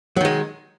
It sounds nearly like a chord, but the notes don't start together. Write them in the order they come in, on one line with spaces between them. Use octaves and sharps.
F#3 D#3 G#3